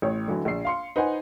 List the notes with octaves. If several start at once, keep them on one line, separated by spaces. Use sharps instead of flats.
A1 C#5
D3 E3 F#3
A#1 C7
F5 C6 C#7
D#4 B4 C5 F#5 G#5